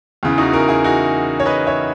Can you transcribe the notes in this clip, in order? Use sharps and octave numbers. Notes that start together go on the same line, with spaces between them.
E2 C#3 E3
D#4 F#4
F#4 A#4
E4 G#4
D#4 F#4
C#5
B4 D#5
C#5 E5